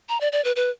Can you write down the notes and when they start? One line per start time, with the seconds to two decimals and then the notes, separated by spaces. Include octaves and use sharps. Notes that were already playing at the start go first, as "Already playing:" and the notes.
0.09 A#5
0.21 D5
0.32 D5
0.44 B4
0.56 B4